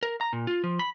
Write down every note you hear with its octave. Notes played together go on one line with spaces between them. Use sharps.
A#4
A#5
A#2
F4
F3
B5